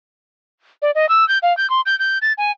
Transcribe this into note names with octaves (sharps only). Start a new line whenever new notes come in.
D5
D#5
E6
G6
F5
G6
C6
G6
G6
A6
G#5